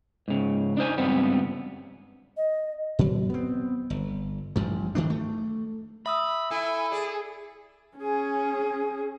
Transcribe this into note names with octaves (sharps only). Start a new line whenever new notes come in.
G#2 C#3
D4 D#4 C5 G#5
C#2 G2 G3 B3 C4
D#5
A#2 F#3
B3 C4
G1
A1 G2 F3
D#3 A3 D4
A3
E5 B5 D#6 E6
E4 A4 G#5
G#4 D5
C#4 G#4